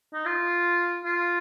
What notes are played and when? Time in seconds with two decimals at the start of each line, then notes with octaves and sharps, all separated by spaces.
0.13 D#4
0.25 F4
1.05 F4